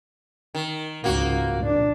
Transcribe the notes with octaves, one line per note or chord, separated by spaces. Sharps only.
D#3
C#2 G#2 A#3 F#4
D4